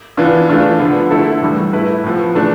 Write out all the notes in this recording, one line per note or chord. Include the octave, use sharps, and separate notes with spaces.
E3 B3 D4 F4
E3 A3 D4 F4
D3 F3 B3
D3 A3 E4 A4
A2 E3 G3
A3 E4 B4
A2 F3 B3
E3 A3 D4